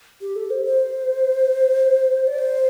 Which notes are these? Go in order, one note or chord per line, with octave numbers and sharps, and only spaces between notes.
G4
A4
C5
C5
D5
C5